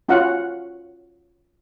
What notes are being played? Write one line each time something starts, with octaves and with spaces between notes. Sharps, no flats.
C#4 F4 F#4 F5 F#5